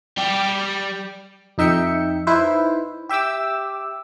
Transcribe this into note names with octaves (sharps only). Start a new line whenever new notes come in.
G3 G4
F2 D#4 E5 G5 C#7
D#4 E4 B4 C5
G4 E5 G5 D6 E6